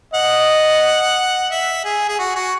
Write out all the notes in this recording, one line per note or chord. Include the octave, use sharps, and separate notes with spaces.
D#5 F#5
E5
G#4
G#4
F#4
F#4